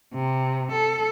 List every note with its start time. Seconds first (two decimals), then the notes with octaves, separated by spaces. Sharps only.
0.14 C3
0.73 A4